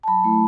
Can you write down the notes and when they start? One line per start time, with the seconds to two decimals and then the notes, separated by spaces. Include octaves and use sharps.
0.03 A5
0.08 F#3 B5
0.24 A3 E4